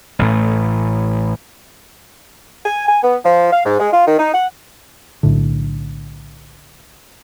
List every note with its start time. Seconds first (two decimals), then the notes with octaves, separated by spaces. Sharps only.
0.19 A1 A2 A3
2.65 G#5
2.87 G#5
3.03 B3
3.25 F3
3.52 F5
3.65 G#2
3.79 G#3
3.93 F4
4.07 D#3
4.18 D#4
4.33 F#5
5.23 B1 A2 D3